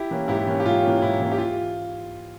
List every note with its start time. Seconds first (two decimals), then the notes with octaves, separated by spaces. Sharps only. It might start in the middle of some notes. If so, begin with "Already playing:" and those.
Already playing: E4 G4
0.11 E3 A#3 C#4
0.28 G#2 E4 G4
0.47 E3 A#3 C#4
0.60 G4
0.65 G#2 F4
0.83 E3 A#3 C#4
1.02 G#2 E4
1.20 E3 A#3 C#4
1.32 G4
1.38 F4